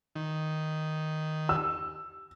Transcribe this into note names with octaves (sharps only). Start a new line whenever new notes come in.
D#3
E6